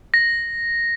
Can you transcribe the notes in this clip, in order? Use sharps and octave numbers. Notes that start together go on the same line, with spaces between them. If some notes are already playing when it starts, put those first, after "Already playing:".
A#6